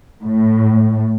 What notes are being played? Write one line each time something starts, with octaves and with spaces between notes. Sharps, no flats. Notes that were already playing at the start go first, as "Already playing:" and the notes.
A2